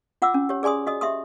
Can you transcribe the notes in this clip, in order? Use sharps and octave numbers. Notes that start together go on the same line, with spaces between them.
F4 F#5 D6 E6
C#4
G4 C#5
G#4 D5 G#5 C6 D#6
F#4 D#5 D#6
G4 E5 C6 D#6